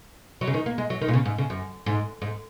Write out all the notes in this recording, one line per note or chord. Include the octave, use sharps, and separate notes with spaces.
F#3
C#3
D#3
A#3
G#3
F#3
D#3
A#2
C#3
G#2
C#3
F#2
G#2
G#2